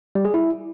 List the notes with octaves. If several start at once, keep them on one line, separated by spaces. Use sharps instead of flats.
G3
G#4
E4